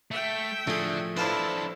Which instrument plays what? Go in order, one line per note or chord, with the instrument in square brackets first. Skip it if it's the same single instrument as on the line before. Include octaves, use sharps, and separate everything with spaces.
[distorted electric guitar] A3 [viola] E5 G5
[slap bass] A2 F3 [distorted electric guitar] D3 [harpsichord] A3 G#4
[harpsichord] F2 F4 B4 [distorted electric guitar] D4 C5 [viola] E4 A5